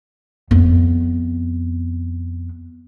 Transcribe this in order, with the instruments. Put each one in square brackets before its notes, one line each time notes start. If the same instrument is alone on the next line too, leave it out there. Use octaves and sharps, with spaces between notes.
[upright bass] F2 B3